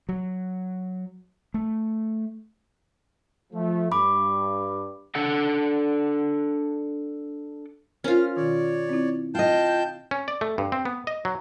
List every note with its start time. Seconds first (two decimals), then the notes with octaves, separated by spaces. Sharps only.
0.09 F#3
1.54 A3
3.53 F3 A3
3.92 G2 B5 D6
5.15 D4 A4 F#5
8.04 C#4 F4 A#4 C5 F6
8.36 B2 D#3 C#5 D5
8.89 C4 E4
9.35 F4 D#5 G5 A5 G6
10.11 C#4
10.28 D5
10.41 A3
10.58 G2
10.72 C4
10.85 B3
11.07 D#5
11.25 F#3